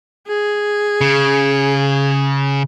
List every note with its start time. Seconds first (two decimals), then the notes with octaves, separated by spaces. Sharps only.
0.28 G#4
1.01 C#3